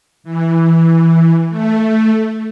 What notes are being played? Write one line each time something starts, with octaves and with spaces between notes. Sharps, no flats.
E3
A3